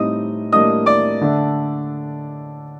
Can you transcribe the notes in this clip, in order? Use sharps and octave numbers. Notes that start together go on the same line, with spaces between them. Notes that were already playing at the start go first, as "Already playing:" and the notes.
Already playing: A2 G3 C4 D#4 D#5 D#6
A2 G3 A#3 D4 D#5 D#6
D5 D6
D3 A3 D4